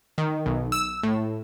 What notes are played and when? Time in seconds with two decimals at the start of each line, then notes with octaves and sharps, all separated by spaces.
0.18 D#3
0.46 B1
0.72 E6
1.03 A2